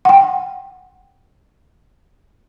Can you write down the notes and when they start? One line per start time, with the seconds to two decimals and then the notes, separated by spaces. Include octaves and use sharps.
0.05 F#5 G5